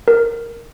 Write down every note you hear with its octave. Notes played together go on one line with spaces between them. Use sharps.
A#4